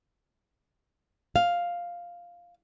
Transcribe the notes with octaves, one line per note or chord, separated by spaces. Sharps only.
F5